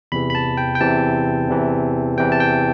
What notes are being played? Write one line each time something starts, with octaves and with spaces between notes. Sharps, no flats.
E2 C3 E3 B5
B5
A5
G5
G5
E2 C3 E3 A5
E2 C3 E3
E2 C3 E3 G5
A5
G5